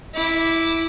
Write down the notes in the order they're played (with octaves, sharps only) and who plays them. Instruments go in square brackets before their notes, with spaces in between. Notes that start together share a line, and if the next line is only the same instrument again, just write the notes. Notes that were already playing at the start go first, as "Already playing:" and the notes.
[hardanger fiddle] E4 D6